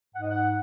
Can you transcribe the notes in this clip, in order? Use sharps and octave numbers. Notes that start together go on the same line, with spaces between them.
G#2 F#5
D#5
F#5